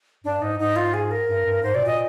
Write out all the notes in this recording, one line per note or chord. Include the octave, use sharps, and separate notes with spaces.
G2 D4
G#2 D#4
G#2 D#4
F4
G#4
A#4
G2
G2
G#2 C5
B2 D5
A#2
D#5